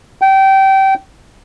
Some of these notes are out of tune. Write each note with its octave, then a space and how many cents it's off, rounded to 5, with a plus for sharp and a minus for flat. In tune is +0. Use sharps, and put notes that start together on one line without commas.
G5 -25